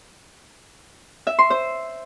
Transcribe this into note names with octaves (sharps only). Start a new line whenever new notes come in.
E5
C6
C5